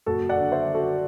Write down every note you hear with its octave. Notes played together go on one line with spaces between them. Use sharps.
F#1 F#4 A4
D5 F#5
D3
C5 E5
D3
F#4 A4